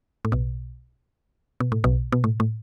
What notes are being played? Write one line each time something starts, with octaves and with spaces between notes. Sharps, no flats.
A2
B1 B2
B2
A2
B1 B2
B2
A2
A2